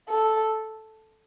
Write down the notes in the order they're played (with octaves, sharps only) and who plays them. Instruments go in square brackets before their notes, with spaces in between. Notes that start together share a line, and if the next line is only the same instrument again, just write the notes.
[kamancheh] A4